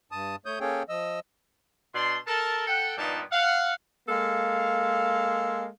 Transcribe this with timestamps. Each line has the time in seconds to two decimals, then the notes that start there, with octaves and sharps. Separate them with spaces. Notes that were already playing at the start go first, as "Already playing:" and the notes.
0.12 G2 A5 D#6
0.46 A3 C#5 D#6 G6
0.60 A#3 C#4 G#4 A4 C#5 G5
0.89 F3 D#5 E6
1.95 B2 D4 A5 C6
2.27 A4 A#4 A5
2.67 A4 F#5 G5
2.98 G2 A#2 F3 B3 D#4 A5
3.32 F5 F#5
4.09 G#3 A#3 A4 F5